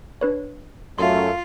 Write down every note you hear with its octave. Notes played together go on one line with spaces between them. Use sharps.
D4 B4 C#5
F#2 A3 F4 C6